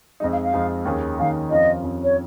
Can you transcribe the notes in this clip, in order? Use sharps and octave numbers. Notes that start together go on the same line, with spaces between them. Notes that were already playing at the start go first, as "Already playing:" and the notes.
F2 F3 G#3 D#4 D#5
F5
F5
F2 F3 G#3 D#4
D#2 D#3 C#4 G#4
D#2 D#3 C#4 G#4 F5
F2 F3 C#4 F4 D#5
F2 F3 C#4 F4
C#5